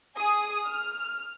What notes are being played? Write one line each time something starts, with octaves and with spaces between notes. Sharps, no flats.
G#4 D#6
F6